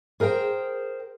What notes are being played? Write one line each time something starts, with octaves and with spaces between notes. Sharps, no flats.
G#4 A#4 C5 E5 G5